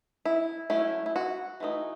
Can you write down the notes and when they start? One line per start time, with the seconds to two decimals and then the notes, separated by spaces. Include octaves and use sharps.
0.25 E4
0.70 F#3 A3 C#4 E4
1.06 E4
1.16 F#4
1.60 E3 A3 D#4